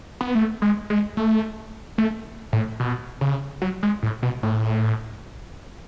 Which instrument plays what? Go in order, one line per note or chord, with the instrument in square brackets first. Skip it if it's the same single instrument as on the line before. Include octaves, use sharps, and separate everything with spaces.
[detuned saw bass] B3
A3
G#3
G#3
A3
A3
A2
B2
C#3
F#3
G#3
A2
B2
A2